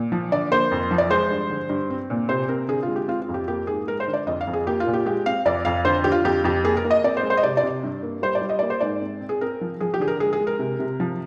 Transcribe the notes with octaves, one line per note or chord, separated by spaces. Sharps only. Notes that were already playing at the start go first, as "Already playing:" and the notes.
Already playing: A#2
F3
D3 D5
A#3 C5
F2
F3
D5
G#3 C5
G2
D3
G2
C4
A#2
C3 C5
C4 A#4
D3 G#4
F4
G#3
G4
C4 F4
F4
F2
G4
A#3 G4
G#2 G#4
G#3 A#4
C5
D3
D5
F2 D#5
F5
F2
G#4
A#3 G4
F4
A#2
G4
G#3 G4
C4 F5
F2 D5
F2 F5
D3 C5
D3 G4
F4
F2 G4
F2 G4
A#3 G#4
A#4
A#3
D#5
C4 D5
C5
G#3
C5
D#5
C3 D5
D5
C3
G2
A#3
G3 C5
D5
G3
D#5
A#3 D5
C5
G#2 D5
C4
C4
G#4
C4 A#4
F3
F3 G#4
G4
D3 G#4
A#4
G#3 G#4
G#4
G#3
A#4
C3
C3
F3